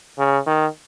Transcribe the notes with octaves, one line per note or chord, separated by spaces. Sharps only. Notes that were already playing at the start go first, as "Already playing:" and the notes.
C#3
D#3